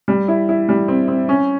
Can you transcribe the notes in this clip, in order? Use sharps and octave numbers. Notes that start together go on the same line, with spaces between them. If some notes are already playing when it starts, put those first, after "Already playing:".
G3
E4
E4
G3
C4
C4
C#4